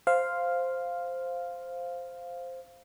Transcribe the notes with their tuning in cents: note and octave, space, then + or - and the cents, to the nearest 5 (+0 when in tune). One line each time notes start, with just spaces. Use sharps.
C5 +0 F5 +0